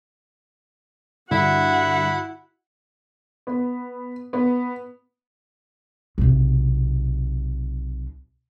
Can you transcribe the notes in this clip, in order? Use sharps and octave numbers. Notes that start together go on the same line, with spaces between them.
G2 D3 E4 F#4 F#5
B3
B3
B1 C3